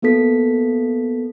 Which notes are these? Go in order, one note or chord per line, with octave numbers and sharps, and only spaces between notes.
A#3 B3 F#4 A4 B6